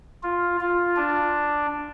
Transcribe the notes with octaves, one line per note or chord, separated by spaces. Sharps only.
F4
F4
D4